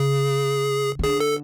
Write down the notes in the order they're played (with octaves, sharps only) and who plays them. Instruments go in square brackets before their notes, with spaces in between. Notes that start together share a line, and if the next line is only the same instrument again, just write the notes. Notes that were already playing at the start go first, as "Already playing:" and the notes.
Already playing: [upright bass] C#3 [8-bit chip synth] G#4
[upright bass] D#3
[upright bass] D3 [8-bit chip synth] G#4
[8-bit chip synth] A4